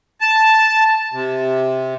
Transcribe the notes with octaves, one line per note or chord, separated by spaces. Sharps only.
A5
C3